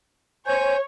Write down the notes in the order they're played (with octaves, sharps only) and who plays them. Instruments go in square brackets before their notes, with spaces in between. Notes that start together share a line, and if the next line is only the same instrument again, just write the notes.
[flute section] C5 G#5 G6 [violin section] C#5